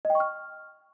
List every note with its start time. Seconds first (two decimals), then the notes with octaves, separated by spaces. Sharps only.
0.05 D#5
0.10 G5
0.15 C#6
0.20 F6